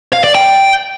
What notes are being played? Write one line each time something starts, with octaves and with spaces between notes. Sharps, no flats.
F5
D5
G5